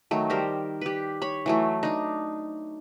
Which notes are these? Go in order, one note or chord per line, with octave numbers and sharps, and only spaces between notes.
D#3 F#3 A3
G3 A#4 C5
G4 B4
C#5 B5
E3 F#3 A3
D4 D#4